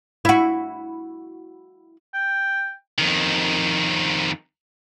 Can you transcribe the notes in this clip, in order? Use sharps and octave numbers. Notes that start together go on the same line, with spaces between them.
E4 F#4
G5
F2 D#3